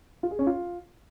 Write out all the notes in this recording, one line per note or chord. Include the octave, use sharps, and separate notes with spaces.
F4
G#4
C#4
F4